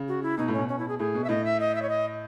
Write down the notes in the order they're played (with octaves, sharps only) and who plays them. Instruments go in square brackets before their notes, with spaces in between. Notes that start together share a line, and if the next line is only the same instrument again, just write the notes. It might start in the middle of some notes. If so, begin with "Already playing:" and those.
Already playing: [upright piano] C#3
[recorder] F#4
E4
[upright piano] B2 [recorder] D#4
[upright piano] A2
[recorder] C#4
[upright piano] B2
[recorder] C#4
E4
G#4
[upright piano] A2 [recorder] G#4
[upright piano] B2
[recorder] E5
[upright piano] A2 [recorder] D#5
[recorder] E5
D#5
E5
C#5
D#5